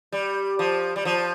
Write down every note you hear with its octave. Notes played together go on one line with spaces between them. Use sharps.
G3
F3
G3
F3